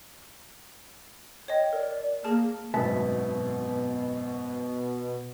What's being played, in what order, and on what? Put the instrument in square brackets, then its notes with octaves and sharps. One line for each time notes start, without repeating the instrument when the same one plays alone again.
[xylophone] C#5 D#5 [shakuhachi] G5
[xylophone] A#4 [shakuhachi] D5
[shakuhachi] A#3 [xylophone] G#4 A5 F6
[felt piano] G#1 F#2 [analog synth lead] B2 [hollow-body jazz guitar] B4 E5 A5